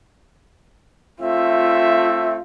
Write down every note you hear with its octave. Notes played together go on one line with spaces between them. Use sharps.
A3 C4 F4 E5